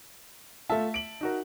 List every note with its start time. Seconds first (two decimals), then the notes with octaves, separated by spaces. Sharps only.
0.70 A3 F4 E5 A5
0.94 D7 F#7
1.21 D#4 F#4 A#4